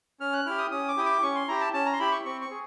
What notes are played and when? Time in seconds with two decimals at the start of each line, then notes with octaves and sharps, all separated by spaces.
0.20 C#4 F6
0.33 F#6
0.46 E4 G4 F6
0.58 D#6
0.71 C#4 D#6
0.88 D6
0.97 E4 G4 D#6
1.06 D6
1.23 C#4 C#6
1.35 C6
1.48 E4 G4 A#5
1.61 A5
1.74 C#4 A5
1.86 A#5
1.93 C6
1.99 E4 G4 B5
2.12 C#6
2.25 C4 C#6
2.41 C#6
2.51 G#4